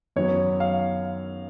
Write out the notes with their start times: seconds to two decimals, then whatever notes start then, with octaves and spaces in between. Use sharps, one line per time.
0.16 F#2 D#3 F#3 B3 C#5
0.60 F5